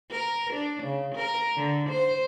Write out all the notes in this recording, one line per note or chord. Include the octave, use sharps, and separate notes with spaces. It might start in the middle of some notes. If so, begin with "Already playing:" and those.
A#4
D4
C#3
A#4
D3
C5